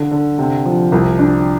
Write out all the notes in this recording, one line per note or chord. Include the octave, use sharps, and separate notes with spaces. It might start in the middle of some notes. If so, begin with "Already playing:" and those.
Already playing: D3
D3
C3
F3
C2
D4